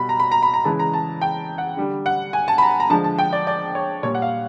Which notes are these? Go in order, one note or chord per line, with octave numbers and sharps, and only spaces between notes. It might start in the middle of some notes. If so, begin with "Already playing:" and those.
Already playing: B2 G3 B5
A#5
B5
A#5
B5
A#5
C#3 E3 G#3 A5
A#5
A5
G5
F#5
D3 G3
F#5
G#5
A5
B5
A#5
A#5
D3 F3 G#3 A5
A5
G5
D5
D5
C#5
A#2 G3 C#5
F#5
F5